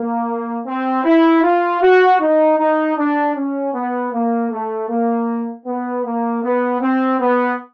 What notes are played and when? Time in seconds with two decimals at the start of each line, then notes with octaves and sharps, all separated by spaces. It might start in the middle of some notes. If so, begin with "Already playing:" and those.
Already playing: A#3
0.66 C4
1.04 E4
1.43 F4
1.81 F#4
2.20 D#4
2.58 D#4
2.97 D4
3.35 C#4
3.74 B3
4.12 A#3
4.51 A3
4.89 A#3
5.66 B3
6.04 A#3
6.43 B3
6.81 C4
7.20 B3